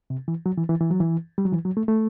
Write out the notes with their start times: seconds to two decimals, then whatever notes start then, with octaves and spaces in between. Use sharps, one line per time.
0.10 C3
0.28 E3
0.46 F#3
0.58 E3
0.69 E3
0.81 E3
0.90 F#3
1.00 E3
1.38 G3
1.45 F#3
1.52 E3
1.65 F#3
1.77 A3
1.88 A3